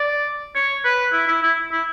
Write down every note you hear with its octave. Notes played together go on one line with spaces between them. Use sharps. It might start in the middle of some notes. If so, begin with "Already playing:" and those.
Already playing: D5
C#5
B4
E4
E4
E4
E4